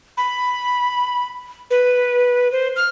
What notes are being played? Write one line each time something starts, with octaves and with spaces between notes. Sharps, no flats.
B5
B4
C5
F6